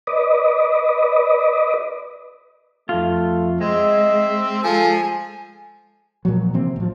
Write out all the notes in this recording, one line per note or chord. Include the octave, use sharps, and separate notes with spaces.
B4 D5 D#5
F2 A3 F4
G#3 C4 D#5 E5
F3 A4 G#5
A#2 F3 F#3
C3 E3 A#3 C4
A1 F3